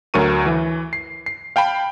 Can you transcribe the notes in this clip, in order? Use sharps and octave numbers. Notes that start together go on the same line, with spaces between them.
D2 F#3 A#4 C#6 D#7
E3
C7
C7
F5 G5 A5 B5